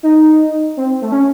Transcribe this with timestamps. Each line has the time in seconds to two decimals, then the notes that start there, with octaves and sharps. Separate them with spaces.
0.03 D#4
0.77 C4
1.02 A3
1.12 C#4